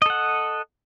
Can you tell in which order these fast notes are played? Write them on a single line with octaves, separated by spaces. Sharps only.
D#5 A4 F#5